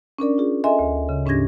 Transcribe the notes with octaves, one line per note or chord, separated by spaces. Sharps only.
C#4 D4 A#4 D5
F4 G#4
A4 D#5 E5 G#5 C6
D2
C#3
G#2 C#4 D4 G4 G#6 A#6